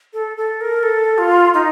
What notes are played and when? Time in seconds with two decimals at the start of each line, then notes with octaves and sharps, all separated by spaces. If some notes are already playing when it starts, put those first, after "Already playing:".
0.13 A4
0.37 A4
0.61 A#4
0.83 A4
1.18 F4
1.54 D#4